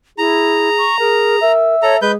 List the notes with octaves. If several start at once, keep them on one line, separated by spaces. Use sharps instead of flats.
E4 G#4 A#5
C#6
G#4 A#4
A#4 E5
A4 C#5 A#5
G#3 G#4 B4 G6